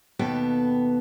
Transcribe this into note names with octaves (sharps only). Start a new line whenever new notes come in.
D#2 B2 B3 A4 G5